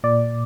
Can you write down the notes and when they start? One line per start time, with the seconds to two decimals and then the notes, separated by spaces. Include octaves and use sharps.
0.04 A#2 D5